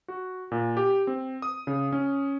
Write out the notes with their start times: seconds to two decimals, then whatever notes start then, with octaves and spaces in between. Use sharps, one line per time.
0.08 F#4
0.52 A#2
0.77 G4
1.07 C4
1.42 D#6
1.67 C#3
1.92 C#4